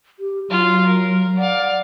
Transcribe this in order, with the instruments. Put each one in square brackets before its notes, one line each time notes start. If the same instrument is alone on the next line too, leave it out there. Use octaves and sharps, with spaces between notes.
[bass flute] G4
[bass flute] F#3 [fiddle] F4 F5
[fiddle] A#4
[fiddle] D5 F5 [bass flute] F#5